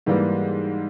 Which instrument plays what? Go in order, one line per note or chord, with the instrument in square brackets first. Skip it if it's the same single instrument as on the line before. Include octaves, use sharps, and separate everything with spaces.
[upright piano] G#2 E3 G3 A#3